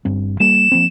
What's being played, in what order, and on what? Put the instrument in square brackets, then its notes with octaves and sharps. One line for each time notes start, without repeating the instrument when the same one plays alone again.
[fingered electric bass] G1 G2 C4
[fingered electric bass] G3 A#3 [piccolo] E7
[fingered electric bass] F3 A#3 C4